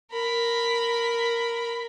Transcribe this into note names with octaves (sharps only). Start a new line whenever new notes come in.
A#4 B5